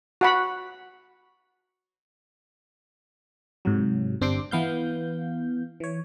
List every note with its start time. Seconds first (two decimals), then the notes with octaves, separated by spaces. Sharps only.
0.21 F#4 F#5 B5
3.65 G#2 C3 F#3
4.21 G1 C4 D4 G4 C6 D6
4.51 E3 B3 F5 G6
5.80 E3 C#5